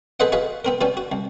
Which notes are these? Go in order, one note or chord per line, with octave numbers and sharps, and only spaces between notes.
G#4 A4 B4 C5 D#5 F#5
F#4 G#4 B4 D#5 F5
B3 C4 A#4
B2 G3 B3 C#4
F#4
C2